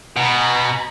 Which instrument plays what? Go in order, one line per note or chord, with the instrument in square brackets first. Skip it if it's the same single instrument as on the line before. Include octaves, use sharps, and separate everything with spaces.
[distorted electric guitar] B2 [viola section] G#5 A#5 B5